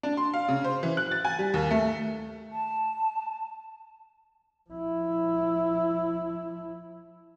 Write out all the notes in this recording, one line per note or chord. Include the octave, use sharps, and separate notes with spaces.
D4
C6
F5
C#3
C5
E3
F#6
A6
G#5
G3
D#2
A3
A5
F3 E4